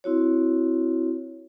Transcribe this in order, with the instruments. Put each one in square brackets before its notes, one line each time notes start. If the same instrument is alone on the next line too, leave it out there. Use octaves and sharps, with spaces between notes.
[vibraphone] C4 E4 F#4 C#5